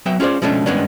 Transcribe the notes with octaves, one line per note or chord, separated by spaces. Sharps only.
F#3 B3 E5 G5
C#4 F4 G#4 C5 D5
B2 F3 G#3 A3 C#4 D4
G2 D#3 G#3 B3 C#4 D4